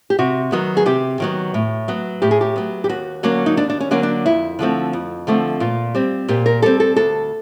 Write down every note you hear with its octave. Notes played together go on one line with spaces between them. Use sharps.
G4
C3 F#4
D#3 F#3 B3
G#4
C3 G4
D#3 F#3 B3
A2
F#3 B3
A2 G4
G#4
G4
F#3 B3
G4
D#2 F#4
D3 F#3 A#3 C#4
D#4
D#2 D4
D4
C#4
D3 F#3 A#3 C#4
D4
F2 E4
D3 F3 A3 C4
F2
D3 F3 A3 C4
A#2 F4
G3 C4
A#2 G4
A#4
G3 C4 A4
A4
D2 A4